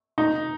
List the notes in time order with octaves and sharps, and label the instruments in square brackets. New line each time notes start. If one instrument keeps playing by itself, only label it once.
[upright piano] D#4